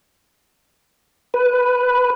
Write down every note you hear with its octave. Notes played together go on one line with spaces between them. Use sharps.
B4